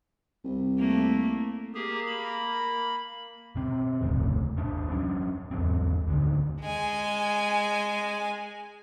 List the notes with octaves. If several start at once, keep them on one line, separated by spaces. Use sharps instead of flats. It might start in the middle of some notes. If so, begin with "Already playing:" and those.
C2
A3 A#3
A#3 G4 G#4
B5
B2 C4
E1 C#2 A2 C3
G#1 D#2 D4
F#3 C#4 D4
E2 G#2 F#3 C4
D2 D3 D#3
G#3 G#5